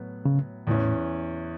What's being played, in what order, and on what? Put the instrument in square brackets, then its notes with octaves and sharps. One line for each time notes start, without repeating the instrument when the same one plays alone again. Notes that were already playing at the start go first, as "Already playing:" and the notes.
Already playing: [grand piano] A2 F#3 B3
[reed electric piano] C#3
[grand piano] E2 E3 C#4 [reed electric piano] A2